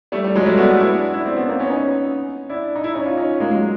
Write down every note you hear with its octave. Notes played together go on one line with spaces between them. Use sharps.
G3 A3
G3
F#3 G#3
G3 A3
A3 B3
A3 B3
D4 E4
D4 E4
C4 D4
B3 C#4
A#3 C4
B3 C#4
C#4 D#4
D4 E4
D#4
D4 E4
C#4 D#4
D#4 F4
C#4 D#4
G#3 A#3
F#3 G#3